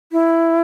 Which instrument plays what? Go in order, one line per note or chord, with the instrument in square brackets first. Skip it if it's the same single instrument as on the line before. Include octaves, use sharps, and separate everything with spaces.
[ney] E4